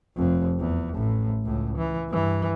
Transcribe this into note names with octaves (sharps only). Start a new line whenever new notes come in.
F1 F2
E2
A1 A2
C#2 A2
E3
G2 E3